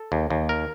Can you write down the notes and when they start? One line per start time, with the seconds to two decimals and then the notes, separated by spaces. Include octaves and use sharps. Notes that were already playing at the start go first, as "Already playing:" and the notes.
Already playing: A4
0.12 D#2
0.30 D#2
0.49 A#4